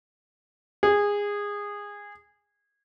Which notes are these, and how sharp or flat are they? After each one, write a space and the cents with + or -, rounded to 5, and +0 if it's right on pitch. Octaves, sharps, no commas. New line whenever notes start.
G#4 -20